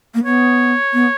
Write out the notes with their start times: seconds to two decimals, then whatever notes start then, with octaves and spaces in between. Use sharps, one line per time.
0.14 A#3
0.25 B3 C#5
0.93 B3